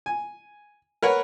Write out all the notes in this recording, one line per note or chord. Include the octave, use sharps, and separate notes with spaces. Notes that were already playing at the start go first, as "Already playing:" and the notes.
G#5
A#4 B4 C#5 F#5